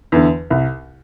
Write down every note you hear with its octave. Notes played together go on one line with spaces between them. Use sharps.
E2 D3
C2